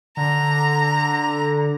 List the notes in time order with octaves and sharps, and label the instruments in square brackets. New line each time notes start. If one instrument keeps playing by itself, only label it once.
[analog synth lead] D3 [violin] A#5